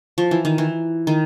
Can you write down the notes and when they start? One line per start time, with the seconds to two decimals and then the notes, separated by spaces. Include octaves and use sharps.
0.18 F3
0.31 E3
0.45 D#3
0.58 E3
1.07 D#3